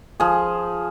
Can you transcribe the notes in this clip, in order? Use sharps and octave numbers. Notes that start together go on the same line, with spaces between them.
F3 G#4